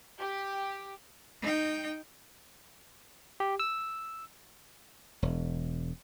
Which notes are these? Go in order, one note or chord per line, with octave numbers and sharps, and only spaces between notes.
G4
D#4 G5
G4
E6
E1